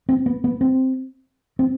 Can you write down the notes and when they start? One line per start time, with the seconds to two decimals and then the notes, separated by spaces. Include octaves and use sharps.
0.09 C4
0.26 B3
0.44 B3
0.61 C4
1.59 C4